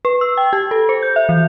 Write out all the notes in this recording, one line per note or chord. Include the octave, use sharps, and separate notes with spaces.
B4
E6
G5
G4
A4
C5
G6
E5
E3